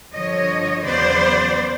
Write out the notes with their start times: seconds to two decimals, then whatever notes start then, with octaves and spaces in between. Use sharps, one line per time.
0.14 G2 D3 F3 C#5 D#5
0.84 E2 C#3 F#3 B3 C5 D5